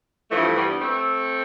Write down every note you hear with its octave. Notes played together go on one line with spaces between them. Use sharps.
G2 E3 F3 A3
G3 B3
A3 C4